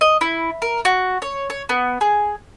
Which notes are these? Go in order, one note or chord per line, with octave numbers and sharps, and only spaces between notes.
D#5
E4
A#4
F#4
C#5
C#5
B3
G#4